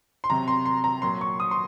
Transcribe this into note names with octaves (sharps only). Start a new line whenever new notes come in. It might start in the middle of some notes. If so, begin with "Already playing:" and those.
C6
C3 F#3 A#5
C6
C6
A#5
A#2 F#3 C6
C#6
D#6
C6